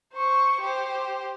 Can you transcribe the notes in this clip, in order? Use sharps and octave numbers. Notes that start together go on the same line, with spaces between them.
C5 C#6
G4 C5